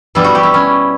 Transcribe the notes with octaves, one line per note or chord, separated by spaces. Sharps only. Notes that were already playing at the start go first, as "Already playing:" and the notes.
B2 G3 B3 E4
F#4
G4
E4
C#4